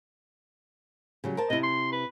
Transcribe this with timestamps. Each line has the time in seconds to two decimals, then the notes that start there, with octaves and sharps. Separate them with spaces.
1.24 C#3 F#3 G3
1.37 A#4 C5 A5
1.50 C3 E4 D#5
1.63 C6
1.92 B4